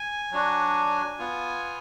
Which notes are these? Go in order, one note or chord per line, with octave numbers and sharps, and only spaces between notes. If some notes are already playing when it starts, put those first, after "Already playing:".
Already playing: G#5
F#3 D4 F#4
B3 F4